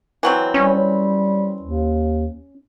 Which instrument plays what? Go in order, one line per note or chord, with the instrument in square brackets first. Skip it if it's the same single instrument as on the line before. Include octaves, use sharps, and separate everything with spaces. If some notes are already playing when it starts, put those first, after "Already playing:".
[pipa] E3 F#3 C4
[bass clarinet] G3 [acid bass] C#4
[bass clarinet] D#2